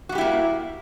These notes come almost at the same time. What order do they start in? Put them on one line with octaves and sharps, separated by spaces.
F#4 G3 G4 E4 A#3